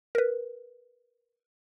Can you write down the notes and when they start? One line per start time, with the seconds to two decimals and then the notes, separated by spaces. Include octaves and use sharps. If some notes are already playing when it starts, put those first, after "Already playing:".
0.15 A#4 B4